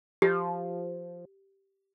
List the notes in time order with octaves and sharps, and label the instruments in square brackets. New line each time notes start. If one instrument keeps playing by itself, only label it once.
[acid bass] F3 [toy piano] G4